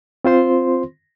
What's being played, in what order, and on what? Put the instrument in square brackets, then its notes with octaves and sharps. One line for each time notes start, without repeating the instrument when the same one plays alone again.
[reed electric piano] C4 F4 C5 C6